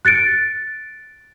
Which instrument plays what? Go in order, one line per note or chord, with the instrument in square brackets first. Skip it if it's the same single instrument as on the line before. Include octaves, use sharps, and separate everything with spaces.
[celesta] F#6 A6 C#7 D7